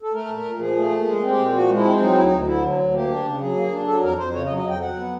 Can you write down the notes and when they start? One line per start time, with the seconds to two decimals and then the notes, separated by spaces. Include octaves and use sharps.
0.02 A4
0.13 A3 A#4
0.29 A#2
0.36 A#4
0.45 A#2
0.60 F3 G#4
0.76 A3
0.91 A#2
1.06 G#3 G#4
1.22 C4
1.31 G4
1.37 A#2
1.53 F3 F#4
1.69 G#3
1.77 E4
1.84 C4
2.00 F#3 D#4
2.15 D2 E4
2.24 D#4
2.31 D2
2.46 D3 E4
2.62 F#3
2.78 D2
2.94 A#3 G4
3.09 D4
3.26 C#3
3.40 F#3 G#4
3.56 A#3
3.72 D4
3.87 F#3 A4
4.02 F2 A#4
4.18 F2 C5
4.34 C#3 C#5
4.46 D#5
4.49 F#3
4.57 D#5
4.66 F2 G5
4.81 F#3 F#5
4.96 B3